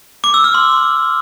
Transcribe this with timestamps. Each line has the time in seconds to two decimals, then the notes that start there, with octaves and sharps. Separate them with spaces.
0.24 D6
0.34 E6
0.44 F6
0.54 C6